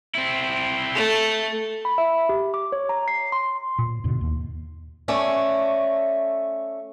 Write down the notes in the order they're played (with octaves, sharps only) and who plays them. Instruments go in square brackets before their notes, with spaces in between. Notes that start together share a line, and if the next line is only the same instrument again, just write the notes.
[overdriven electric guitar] C4 E4
[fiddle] A3
[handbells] B5
E5
G4
D6
C#5
A#5
C7
C6
[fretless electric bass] A#2
E2 G#2 B2 D3
D#2
[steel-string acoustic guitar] A3 C#4 D5